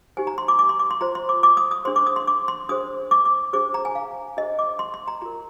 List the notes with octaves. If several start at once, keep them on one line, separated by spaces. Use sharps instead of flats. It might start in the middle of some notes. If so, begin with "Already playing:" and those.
D#4 G4 C5 G#5
A#5
C6
D6
D6
C6
D6
C6
F4 C5 A#5
C6
D6
D6
D#6
D#6
D4 G#4 C5 C6
D6
D#6
C6
D6
C6
D4 G#4 C5 D#6
D6
D6
D4 G#4 C5 D6
A#5
G#5
F5
D4 G#4 C5 D#5
D6
C6
C6
A#5
F4 A#4 A#5